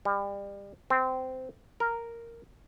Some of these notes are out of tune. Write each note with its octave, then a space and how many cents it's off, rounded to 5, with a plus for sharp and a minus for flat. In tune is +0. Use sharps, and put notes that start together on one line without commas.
G3 +30
C4 -15
A#4 -5